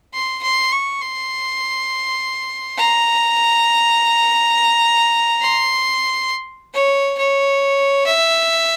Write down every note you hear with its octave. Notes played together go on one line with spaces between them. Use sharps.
C6
C6
C#6
C6
A#5
C6
C#5
C#5
E5